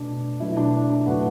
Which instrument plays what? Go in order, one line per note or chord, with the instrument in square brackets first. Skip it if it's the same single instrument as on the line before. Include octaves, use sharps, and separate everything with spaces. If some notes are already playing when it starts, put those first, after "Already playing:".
Already playing: [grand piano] B2 A3 D4
B2 F#3 A3 E4
D4
D4
A2 F#3 A3 F#4 B4